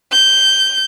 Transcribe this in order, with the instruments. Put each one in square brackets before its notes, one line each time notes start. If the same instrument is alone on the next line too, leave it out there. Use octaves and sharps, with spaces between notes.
[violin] G6